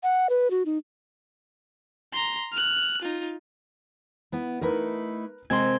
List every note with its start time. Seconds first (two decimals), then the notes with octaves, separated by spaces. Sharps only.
0.03 F#5
0.30 B4
0.51 F#4
0.66 D#4
2.13 A#5 C6
2.52 F6 F#6
3.02 D#4 F4
4.32 B3 E4
4.61 A3 D#4 E4 A#4 B4
5.50 C3 G#3 C4 A#4 D#5 G#5 C6 G#6